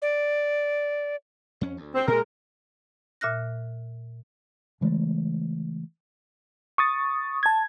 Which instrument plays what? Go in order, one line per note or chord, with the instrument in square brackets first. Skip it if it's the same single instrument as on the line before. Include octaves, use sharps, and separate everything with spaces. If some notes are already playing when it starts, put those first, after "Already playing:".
[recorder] D5
[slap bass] F2 C#4
D2
[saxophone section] C4
[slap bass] A#2 [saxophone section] G#3 A#4
[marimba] A#2 E5 F6 F#6 A#6
[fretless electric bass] C#3 E3 G#3 A3
[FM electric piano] C#6 D#6 A6
A5 G#6